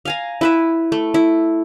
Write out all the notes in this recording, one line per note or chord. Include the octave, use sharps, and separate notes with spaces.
F5 G#5 A#5
E4 B4 E5
A3
E4